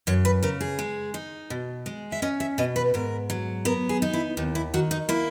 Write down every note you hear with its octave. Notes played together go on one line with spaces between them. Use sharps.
F#2 C#5
B4
C#3 A#4
G#4
G#3
D#4
B2
G#3
E5
C#4 D#5
E5
B2 D#5
B4
G#2 A#4
F#3
B3 A#4
G#4
D#4
E4
D#2 D#4
E4
D#3 F#4
D#4
A#3 E4